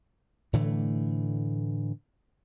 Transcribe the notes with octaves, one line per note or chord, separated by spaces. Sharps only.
A2 D3 E3 A3